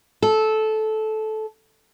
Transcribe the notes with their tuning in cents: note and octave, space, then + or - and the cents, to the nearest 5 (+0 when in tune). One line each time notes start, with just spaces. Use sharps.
A4 -15